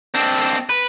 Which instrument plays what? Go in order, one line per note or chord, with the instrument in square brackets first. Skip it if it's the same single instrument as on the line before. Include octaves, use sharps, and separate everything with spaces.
[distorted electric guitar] C4 D4
B4